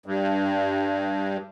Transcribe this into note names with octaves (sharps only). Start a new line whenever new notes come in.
G2